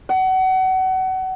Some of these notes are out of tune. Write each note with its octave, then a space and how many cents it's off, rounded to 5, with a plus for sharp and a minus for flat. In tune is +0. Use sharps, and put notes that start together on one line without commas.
F#5 +30